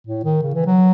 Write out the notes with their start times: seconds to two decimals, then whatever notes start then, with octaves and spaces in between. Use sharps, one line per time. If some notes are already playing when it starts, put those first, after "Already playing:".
0.07 A2
0.24 D#3
0.42 C#3
0.55 E3
0.66 F#3